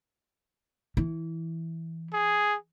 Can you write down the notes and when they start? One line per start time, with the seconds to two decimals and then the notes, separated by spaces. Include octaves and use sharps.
0.97 E3
2.13 G#4